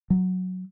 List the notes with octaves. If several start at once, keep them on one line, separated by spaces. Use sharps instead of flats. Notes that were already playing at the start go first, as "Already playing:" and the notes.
F#3